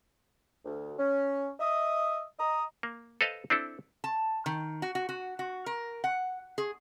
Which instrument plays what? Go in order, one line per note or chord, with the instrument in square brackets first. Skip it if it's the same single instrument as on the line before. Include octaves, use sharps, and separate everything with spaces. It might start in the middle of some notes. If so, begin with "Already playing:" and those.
[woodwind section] D2
C#4
D#5 E5 D#6
D#5 A#5 D#6
[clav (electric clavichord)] A#3
A4 B4 C5 D#5 F5 A5
C4 D4 E4 A4
[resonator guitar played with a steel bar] A5
D#3
F#4
F#4
F#4
F#4
A#4
F#5
G#4